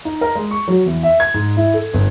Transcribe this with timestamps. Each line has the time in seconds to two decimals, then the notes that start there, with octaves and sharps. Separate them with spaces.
0.05 D#4
0.21 A#4
0.35 G#3
0.51 C#6
0.68 F#3
0.86 E2
1.03 E5
1.20 G#6
1.34 G#2
1.57 E4
1.74 A4
1.94 G1